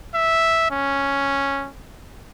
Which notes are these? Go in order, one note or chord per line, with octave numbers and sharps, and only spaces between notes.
E5
C#4